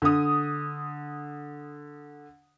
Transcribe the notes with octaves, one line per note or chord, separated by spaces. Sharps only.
D3 D#6